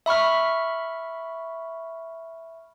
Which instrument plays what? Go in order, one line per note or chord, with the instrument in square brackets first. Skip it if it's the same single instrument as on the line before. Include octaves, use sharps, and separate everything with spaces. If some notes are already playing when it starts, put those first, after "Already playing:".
[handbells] E5 B5 C#6 F6